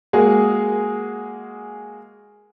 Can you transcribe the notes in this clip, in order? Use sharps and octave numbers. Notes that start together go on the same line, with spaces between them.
G#3 A#3 F#4 G#4